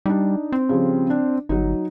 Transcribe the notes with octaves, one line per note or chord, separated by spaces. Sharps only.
G3 D4 D#4
C4
C#3 F3 G3
D4
G1 F#3 D#4